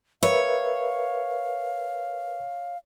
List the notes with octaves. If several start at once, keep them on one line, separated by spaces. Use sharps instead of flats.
A#4 B4 C#5 E5 F5